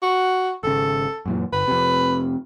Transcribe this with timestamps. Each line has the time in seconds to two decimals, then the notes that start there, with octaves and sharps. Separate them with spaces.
0.02 F#4
0.63 G#1 C#3 A4
1.26 F#2 A#2 E3
1.53 G1 B4
1.68 F2 C3